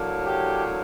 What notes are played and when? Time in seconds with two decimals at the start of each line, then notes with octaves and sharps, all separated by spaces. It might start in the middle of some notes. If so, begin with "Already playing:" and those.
Already playing: A2 F#3 A#3 D4
0.26 G4